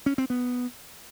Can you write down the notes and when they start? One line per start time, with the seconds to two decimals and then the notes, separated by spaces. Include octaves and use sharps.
0.06 C#4
0.18 C4
0.30 B3